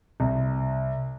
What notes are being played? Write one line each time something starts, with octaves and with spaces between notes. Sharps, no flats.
C2